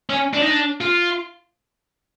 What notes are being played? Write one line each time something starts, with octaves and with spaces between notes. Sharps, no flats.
C#4
D4
D#4
D4
F4